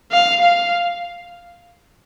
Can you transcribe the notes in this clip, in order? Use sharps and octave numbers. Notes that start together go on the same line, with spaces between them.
F5
F5